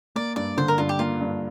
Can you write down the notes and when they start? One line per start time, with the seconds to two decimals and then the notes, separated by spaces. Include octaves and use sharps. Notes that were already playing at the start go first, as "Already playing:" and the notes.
0.16 A#3 D5
0.36 G2 D5
0.57 D3 C5
0.68 A#4
0.78 G2 F4
0.89 G4
0.99 A#3 F4
1.21 G2